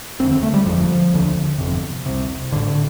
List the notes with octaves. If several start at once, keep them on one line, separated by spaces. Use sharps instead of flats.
F1 D#2 D3 C4
C4
A3
G3
G1 F2 D3 F3
F1 D#2 D3
G1 F2 C3
C2 C3
A1 A2 D3